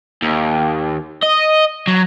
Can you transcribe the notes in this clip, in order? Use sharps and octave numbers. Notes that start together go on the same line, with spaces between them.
D#2
D#5
F#3